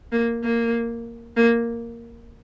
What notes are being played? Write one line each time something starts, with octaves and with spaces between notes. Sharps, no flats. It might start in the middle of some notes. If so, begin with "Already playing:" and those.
A#3
A#3
A#3